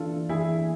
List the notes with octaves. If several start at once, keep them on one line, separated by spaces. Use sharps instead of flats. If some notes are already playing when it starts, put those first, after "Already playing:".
Already playing: E3 D4 F4 A4
E3 E4 G#4